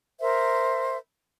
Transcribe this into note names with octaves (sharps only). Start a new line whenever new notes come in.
A#4 C5 E5